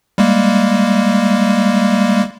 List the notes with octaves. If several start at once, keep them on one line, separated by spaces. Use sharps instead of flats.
G3 G#3 A#3